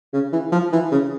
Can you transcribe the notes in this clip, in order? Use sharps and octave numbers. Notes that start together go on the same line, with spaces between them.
C#3
E3
F3
E3
C#3